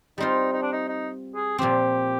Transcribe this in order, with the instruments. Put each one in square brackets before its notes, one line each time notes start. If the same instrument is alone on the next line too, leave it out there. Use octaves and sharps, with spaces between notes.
[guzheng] G3 C4 F4 [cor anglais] D#4
[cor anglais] D#4
D4
D#4
D#4
G#4
[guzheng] A#2 F3 C4 [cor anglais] G4